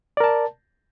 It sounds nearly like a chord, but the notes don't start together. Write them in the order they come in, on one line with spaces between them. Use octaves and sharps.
D5 A#4 A5